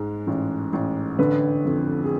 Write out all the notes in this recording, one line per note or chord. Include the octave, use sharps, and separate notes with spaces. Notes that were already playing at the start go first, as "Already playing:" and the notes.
Already playing: G#2 G#3
A1
A1
D3 B4
F2
G#4